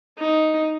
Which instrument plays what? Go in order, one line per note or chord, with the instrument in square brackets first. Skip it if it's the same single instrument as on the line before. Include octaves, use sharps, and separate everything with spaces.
[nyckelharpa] D#4